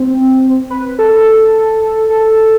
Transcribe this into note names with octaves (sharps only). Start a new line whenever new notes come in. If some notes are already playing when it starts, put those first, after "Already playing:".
Already playing: C4
B4
A4
A4